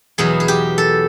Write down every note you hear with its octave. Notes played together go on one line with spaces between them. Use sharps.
E2 B2 F#3 G#4
G#4
G4
A4